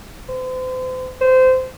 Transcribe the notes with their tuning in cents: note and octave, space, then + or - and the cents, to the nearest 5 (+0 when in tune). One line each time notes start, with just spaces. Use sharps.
C5 -40
C5 -20